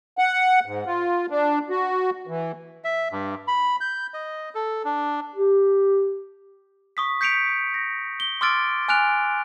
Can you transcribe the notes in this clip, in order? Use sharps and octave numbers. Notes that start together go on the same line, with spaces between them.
F#5
G#2
F4
D4
F#4
E3
E5
G2
B5
G6
D#5
A4
D4
G4
C#6 D#6 B6
G6 B6 C#7 D7 F7
A#6
G7
C6 D6 E6 F6 A6 D7
G#5 F6 F#6 D7 F7